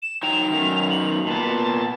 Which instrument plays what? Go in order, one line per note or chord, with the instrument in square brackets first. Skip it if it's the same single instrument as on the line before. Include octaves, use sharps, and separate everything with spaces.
[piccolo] E7
[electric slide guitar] F#3 D#4 G5 [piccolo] F7
[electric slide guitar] F#2 D#3
[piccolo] F#7
[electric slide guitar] A#2 B3 [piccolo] A5